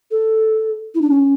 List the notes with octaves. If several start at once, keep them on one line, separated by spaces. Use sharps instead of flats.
A4
E4
D4
C#4